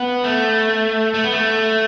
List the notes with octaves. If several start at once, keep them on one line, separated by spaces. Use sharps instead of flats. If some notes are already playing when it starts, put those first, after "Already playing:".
Already playing: B3
A3
A3
B3
A3